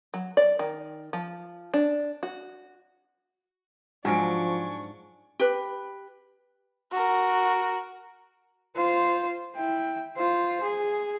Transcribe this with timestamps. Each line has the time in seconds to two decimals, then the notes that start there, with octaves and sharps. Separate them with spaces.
0.14 F#3
0.37 D5
0.59 D#3
1.13 F3
1.74 D4
2.23 F#4
4.05 G#2 F3 F#3 D4 G#5 C#6 D7
5.40 G4 B4
6.92 F#4 A#4
8.76 F4 C5
9.56 E4 G5
10.17 F4 C5
10.63 G#4